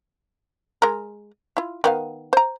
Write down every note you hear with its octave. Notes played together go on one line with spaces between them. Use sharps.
G#3 A#4
E4 F4
D#3 B3 F5
C5 A#5